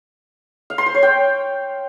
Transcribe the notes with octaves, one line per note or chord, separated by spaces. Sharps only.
F5
C6
C5
C#5
G5